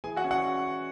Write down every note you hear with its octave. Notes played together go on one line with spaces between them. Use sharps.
E3 G#4 G#5
F#4 F#5
C#4
F#5